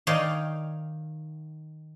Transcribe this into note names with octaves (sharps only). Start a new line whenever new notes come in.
D#3 D#4 C#5 D5 F5 G5